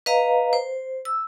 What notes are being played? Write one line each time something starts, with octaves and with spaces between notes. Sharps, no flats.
B4 D#5 F5 A#5
C5
E6